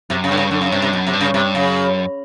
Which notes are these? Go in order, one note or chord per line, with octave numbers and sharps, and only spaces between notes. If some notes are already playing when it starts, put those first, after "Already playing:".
F#2 C3
C#3
G2 D3
C#3
F#2 D3
C#3
G2 C3
C3
F#2 B2
C3
G2
C#3
G2 C3
F#2 C#3